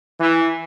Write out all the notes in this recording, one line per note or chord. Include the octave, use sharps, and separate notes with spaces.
E3